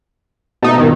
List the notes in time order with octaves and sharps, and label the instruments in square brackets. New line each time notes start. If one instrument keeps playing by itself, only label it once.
[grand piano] B2 [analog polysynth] A3 D#4
[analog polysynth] G2 A#2 D#3